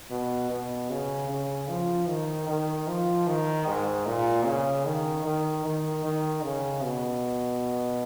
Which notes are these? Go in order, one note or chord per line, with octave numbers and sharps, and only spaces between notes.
B2
B2
C#3
C#3
F3
D#3
D#3
F3
D#3
G#2
A#2
C#3
D#3
D#3
D#3
D#3
C#3
B2